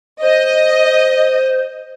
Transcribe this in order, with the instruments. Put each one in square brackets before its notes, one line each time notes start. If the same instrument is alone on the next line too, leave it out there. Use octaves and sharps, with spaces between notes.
[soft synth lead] C5 [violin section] D#5